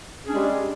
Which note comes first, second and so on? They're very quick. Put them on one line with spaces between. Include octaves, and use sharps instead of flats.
G#4 C#4 D4 G#3 G3